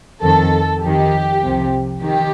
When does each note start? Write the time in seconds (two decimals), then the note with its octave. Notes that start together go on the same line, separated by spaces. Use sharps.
0.23 F2 D#3 A4
0.83 F2 D#3 G4
1.43 C2 C3 F3
2.02 D#3 G4